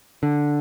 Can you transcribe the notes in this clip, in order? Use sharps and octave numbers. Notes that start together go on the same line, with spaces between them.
D3